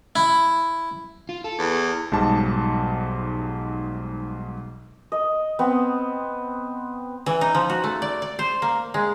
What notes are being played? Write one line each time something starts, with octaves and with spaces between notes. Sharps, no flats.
E4
F4
A4
E2
B1 G#2 G3 A5
D#5
B3 C4
E3
D#4
F3
F#4
A3
D5
D5
C5
A#3
G#3